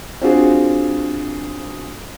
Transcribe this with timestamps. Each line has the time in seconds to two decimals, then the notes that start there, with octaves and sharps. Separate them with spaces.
0.21 C4 D4 F4 F#4 G#4